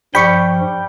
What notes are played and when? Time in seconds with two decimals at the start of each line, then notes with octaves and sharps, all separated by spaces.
0.15 G2 F3 G3 G5 B5 C#6